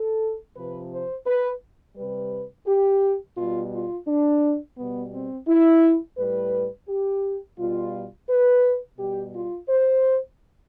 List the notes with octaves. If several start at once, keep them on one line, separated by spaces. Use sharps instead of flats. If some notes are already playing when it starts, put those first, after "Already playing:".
Already playing: A4
C3 F3 B4
C5
B4
C3 G3 B4
G4
B2 G3 F4
F4
D4
B2 G3 B3
C4
E4
A2 G3 B4
G4
B2 G3 F4
B4
B2 G3 G4
F4
C5